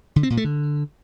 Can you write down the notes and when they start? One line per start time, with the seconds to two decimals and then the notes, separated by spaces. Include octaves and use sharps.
0.16 D3
0.23 C4
0.30 A#2
0.37 A3
0.44 D3